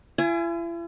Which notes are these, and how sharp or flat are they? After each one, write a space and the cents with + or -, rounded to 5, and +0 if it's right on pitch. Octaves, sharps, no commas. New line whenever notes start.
E4 +45 G#5 +0